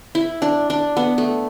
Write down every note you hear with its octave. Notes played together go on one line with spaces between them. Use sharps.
E4
D4
D4
B3
A3